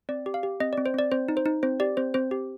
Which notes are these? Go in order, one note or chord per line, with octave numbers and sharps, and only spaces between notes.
C4 D5
G4
F5
G4
C4 D#5
C4 D5
C5
C4 D5
C4 C5
D#4
C5
D#4
C4 C5
G4 D5
C4 C5
C4 C5
G4